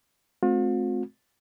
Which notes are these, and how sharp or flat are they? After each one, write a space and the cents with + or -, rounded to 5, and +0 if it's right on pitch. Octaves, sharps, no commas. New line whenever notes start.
A3 -35 C4 +0 F4 +45